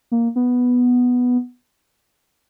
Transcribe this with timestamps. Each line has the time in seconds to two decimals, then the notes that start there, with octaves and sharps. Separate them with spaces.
0.11 A#3
0.36 B3